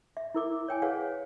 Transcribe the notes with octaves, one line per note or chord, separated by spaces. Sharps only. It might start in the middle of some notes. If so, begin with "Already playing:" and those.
E5
E4 A#4 D6
C#5 G5 G#5
G#4 B4 C#5 F5 F#5